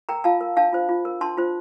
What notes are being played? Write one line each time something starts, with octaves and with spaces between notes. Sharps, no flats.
A#4 G5 A#5
F4 F5 A5
A#4
D4 F5 A5
F4 C5
F4
A#4
D4 A5 C6
F4 C5